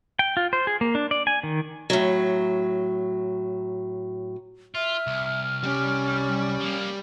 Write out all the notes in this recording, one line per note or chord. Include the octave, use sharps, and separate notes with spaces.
G5
F4
C5
G#4
A#3
D4
D5
G#5
D#3
A2 F#3
F4 E5 F6
C2
G3 C#4 G4
F3 A#3